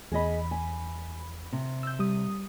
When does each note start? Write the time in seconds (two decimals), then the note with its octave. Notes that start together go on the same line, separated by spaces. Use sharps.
0.12 E2 G#4 D#5 B5
0.51 G#5
1.53 C3
1.83 E6 G6
1.99 G3 D#6